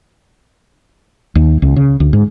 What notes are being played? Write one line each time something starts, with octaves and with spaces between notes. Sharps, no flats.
D#2
C#2
C#3
D2
G#2